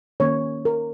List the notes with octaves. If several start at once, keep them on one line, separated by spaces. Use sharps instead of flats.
D#3 A#3 C#4 C#5
A#4